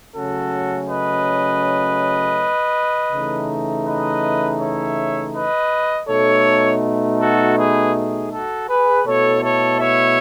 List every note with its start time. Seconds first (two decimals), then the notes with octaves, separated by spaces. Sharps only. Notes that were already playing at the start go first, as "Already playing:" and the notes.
0.15 C#3 F#3 A3 C#4 F#4 A4
0.89 B4 D#5
3.12 C#3 E3 A3 D#4
3.86 B4 D#5
4.60 C#5 E5
5.35 B4 D#5
6.09 B2 A3 D#4 A4 C#5
7.20 F#4 A4
7.58 G#4 B4
7.95 G#4
8.31 F#4 A4
8.68 G#4 B4
9.06 B2 A3 E4 A4 C#5
9.43 A4 C#5
9.80 C#5 E5